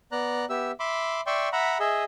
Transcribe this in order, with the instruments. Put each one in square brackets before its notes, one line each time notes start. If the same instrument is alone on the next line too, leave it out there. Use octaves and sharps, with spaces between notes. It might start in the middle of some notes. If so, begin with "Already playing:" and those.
[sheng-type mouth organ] B3 D5 A#5 F#6
B3 G4 E5 E6
E5 B5 C6 D6
D5 E5 G5 C6 C#6
E5 F#5 A#5 B5
G#4 D#5 E5